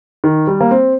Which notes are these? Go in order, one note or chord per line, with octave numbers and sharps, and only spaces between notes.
D#3
G3
A#3
C4